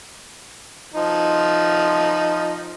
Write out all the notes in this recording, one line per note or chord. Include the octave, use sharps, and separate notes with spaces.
F3 D#4